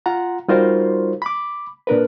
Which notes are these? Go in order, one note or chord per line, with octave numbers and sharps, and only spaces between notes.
F4 F#5 A#5
G3 D#4 F4 F#4 A#4 C5
B5 D6
A#2 D4 A#4 B4